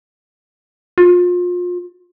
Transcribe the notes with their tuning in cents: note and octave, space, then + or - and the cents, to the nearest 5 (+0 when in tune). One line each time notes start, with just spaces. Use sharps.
F4 +30